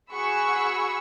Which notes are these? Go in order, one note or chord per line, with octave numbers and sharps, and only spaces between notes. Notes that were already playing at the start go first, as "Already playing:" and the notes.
F#4 G#4 F#5 B5 C#6 E6